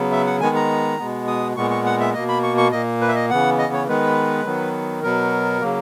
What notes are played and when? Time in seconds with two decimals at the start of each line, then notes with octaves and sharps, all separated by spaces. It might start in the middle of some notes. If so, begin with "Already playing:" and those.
Already playing: C#3 F#3 B3
0.12 E5
0.27 F#5
0.41 D#3 G#3 B3 G#5
0.56 A#5
0.99 B2 G#3 B3
1.27 D#6
1.56 A#2 G#3 B3 C#6
1.70 C#6
1.86 F#5
2.00 E5
2.14 B2 A#3 D#5
2.28 B5
2.43 C#6
2.58 C#6
2.72 A#2 A#3 D#5
3.01 B4
3.08 E5
3.15 D#5
3.29 C#3 E3 B3 F#5
3.59 D#5
3.73 C#5
3.88 D#3 G#3 B3 B4
4.46 D#3 F#3 B3
5.03 B2 F#3 B3 A#4
5.61 C#3 F#3 A#3